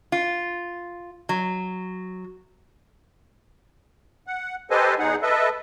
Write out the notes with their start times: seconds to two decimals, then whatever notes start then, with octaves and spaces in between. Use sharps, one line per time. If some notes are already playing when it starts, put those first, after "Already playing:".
0.12 F4
1.29 F#3
4.27 F#5
4.70 G4 A4 B4 C5 D#5 G#5
4.99 E2 D#4 G#4 F#5
5.23 A4 B4 D#5 E5